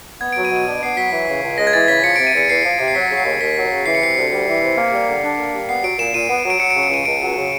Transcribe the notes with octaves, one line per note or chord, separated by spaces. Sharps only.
B3 G#6
D7
F#3
D#7
B2
D#7
D4
B3 C7
F#3 B6
E3
C#3
C#2
G#3 A#6
G#6
E3 A6
C#3 B6
F3 C#7
D7
C3
D#7
E2 C#7
E2 C7
F3
C3
C7
F#3 B6
C#3 C#7
C7
D#2
D#2 B6
F#3
C#3
E3 C7
C#7
C3 C7
D2
G3
E3
C3
A#3
G3
D3
D4
A#3
G3
B3 C7
F#3 D7
A#2 E7
A#2 D#7
B3
F#3 D7
F#3 C#7
D7
C#3
D7
C#2 D#7
C#2 D7
F#3
C#3